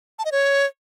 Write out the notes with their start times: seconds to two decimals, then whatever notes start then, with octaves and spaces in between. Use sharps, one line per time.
0.19 A5
0.25 D#5
0.32 C#5